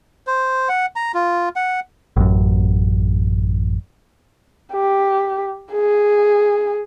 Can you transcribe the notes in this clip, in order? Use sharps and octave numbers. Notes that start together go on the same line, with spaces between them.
C5
F#5
A#5
F4
F#5
A1 F#2
G4
G#4